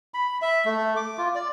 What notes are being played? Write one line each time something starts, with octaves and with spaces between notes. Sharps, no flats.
B5
E5
A3
D6
F4
D5